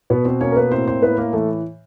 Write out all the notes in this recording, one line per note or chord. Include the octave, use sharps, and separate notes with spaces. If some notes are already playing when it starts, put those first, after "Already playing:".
B2 B3 B4
C4 C5
A#3 C#4 C#5
A#4
B3 B4
A2 C4 C5
C4 C5
A2 B3 B4
A#3 A#4
E3 A3 A4